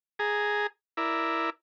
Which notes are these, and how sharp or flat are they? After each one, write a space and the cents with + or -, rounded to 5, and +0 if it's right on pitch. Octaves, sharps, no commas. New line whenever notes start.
G#4 +0 A#5 +0
E4 +0 A#4 +0 D5 +0